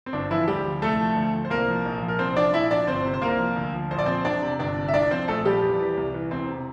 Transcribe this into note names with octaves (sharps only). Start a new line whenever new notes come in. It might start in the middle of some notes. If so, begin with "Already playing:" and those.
C4
G1 D4
E3 F3 E4
D2 G3 G4
F3
C2 A3 A4
F3
D2
F3
C5
C2 A#3 A#4
F3
A#1
F3
A#4
C2 C4 C5
F3 D4 D5
A#1 E4 E5
F3 D4 D5
G1 C4 C5
C3
C5
C2 A#3 A#4
F3
D2
F3
A#1 C5
D5
F3 C4 C5
E1 D4 D5
C3
G1 D4 D5
C3
E5
C2 D4 D5
F3 C4 C5
A#1 A3 A4
F3 G3 G4
E2
E3
C2
E3
E1 C4
C3